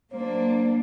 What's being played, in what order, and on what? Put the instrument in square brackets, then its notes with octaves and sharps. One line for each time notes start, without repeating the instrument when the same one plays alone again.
[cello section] F#3 A#3 D4 [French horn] C5